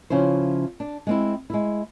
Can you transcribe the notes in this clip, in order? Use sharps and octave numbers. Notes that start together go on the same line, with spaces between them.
C#3 F3 C#4 E4 C5
D4
G#3 C4 E4
G#3 E4